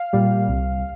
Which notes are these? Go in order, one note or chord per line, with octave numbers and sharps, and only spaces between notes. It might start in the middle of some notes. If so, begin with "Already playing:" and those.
Already playing: F5
A#2 G3
C2